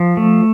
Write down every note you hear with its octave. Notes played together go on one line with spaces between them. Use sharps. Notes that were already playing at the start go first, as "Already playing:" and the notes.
Already playing: F3
A3